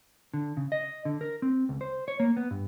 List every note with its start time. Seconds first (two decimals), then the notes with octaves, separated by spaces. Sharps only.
0.34 D3
0.57 C#3
0.72 D#5
1.05 D3
1.21 A#4
1.42 C4
1.69 C#2
1.81 C5
2.08 C#5
2.20 A#3
2.37 B3
2.51 G2